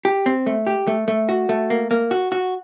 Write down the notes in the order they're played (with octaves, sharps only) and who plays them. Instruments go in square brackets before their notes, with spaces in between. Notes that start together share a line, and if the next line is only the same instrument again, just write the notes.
[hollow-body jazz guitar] G4
C4
A3
G4
A3
A3
F#4
A3
A#3
A#3
F#4
F#4